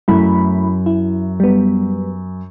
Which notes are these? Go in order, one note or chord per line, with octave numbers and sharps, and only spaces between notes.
F#2 A3 E4 B5
E4
G3 B3